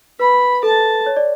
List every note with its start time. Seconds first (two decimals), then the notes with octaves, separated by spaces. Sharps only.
0.20 B4 B5
0.63 A4 A5
1.06 C#5
1.17 D5